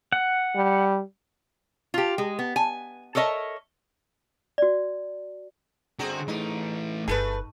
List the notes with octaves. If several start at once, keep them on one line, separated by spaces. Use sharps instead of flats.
F#5
G3
F4 G4
G#3
B3
G#5
A4 A#4 C#5 D#5 E5
F#4 D5
D3 C4 F#4 G#4 A#5
E3 A3 D#4
G1 A3 G#4 A4 B4